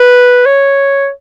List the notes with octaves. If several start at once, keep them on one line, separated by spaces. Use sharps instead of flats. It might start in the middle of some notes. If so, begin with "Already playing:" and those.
Already playing: B4
C#5